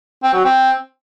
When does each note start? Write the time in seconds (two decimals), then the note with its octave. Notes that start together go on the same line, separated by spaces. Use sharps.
0.23 C4
0.34 F#3
0.44 C4